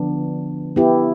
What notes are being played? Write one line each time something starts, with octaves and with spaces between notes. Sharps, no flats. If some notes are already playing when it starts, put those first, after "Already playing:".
Already playing: D3 F3 B3 D4
B3 E4 G4